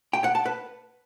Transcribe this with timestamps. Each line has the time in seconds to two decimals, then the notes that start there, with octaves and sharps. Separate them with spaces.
0.13 G5
0.24 F#5
0.35 A5
0.46 B4